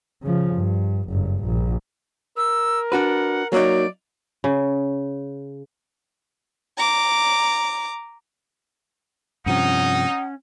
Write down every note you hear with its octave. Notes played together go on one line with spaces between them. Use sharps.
C#3 F3
G2
F#1 G2
A#1
A#4 E6
D4 F#4 B4 F#5
F#3 A#3 D#4 D5
C#3
A#5 D6
G2 C3 F3 C#4 D#4 F#5 D#6